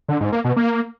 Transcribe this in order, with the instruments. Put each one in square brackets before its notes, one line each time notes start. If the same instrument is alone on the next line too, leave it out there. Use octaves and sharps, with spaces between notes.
[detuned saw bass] D3
G#2
A#3
B2
A#3